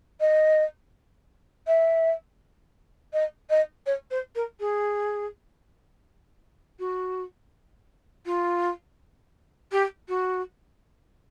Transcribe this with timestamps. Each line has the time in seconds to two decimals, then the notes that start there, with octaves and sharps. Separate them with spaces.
0.20 D#5
1.67 E5
3.13 D#5
3.50 D#5
3.86 C#5
4.10 C5
4.35 A#4
4.60 G#4
6.79 F#4
8.25 F4
9.71 G4
10.08 F#4